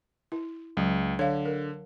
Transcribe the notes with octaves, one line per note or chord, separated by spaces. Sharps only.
E4
C#2 F#3
D3 C#5 F5
A#4